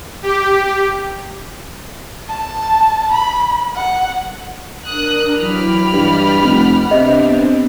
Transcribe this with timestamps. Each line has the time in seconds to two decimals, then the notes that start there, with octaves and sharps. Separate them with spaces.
0.23 G4
2.28 A5
3.12 B5
3.75 F#5
4.87 D4 A#4 D#6 F#6
5.36 E3 F#3 G4 B5 F6
5.93 G2 D#5 G5 A6
6.42 F1 F#5
6.91 C3 B3 C4 D4 D#5